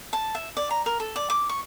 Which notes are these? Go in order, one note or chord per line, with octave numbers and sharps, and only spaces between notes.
A5
E5
D5
A#5
A#4
A4
D5
D6
C#6